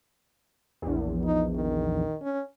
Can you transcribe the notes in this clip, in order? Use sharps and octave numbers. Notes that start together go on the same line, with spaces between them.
A#1 E2
D#4
D#3
C#4